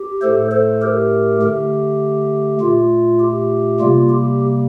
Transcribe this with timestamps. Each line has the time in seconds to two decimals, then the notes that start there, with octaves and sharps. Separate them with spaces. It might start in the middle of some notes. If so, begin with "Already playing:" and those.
Already playing: G4
0.22 A2 A3 A4 C5
0.51 A4 C5
0.82 G4 A#4
1.41 D3 A3 G4
2.60 A#2 A3 F4
3.20 G4
3.80 C3 G3 A#3 F4
4.09 G4